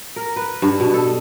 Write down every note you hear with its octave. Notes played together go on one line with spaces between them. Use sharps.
A#4
B4
G2
B2
A4